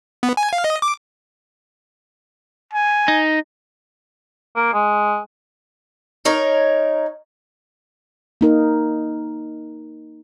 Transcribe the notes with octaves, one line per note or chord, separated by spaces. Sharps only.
B3
G#5
F5
D#5
D6
G#5
D#4
A#3
G#3
D#4 A#4 C#5
A#3 D#4 A#4